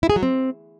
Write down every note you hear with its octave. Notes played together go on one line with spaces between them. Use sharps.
E4
G#4
F#3
C4